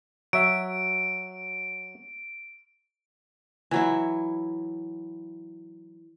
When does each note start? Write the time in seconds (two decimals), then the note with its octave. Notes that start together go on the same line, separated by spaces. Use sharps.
0.33 F#3 E5 D7
3.71 E3 F#3 E4